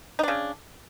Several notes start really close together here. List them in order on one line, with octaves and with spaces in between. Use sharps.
D#4 D4 C#3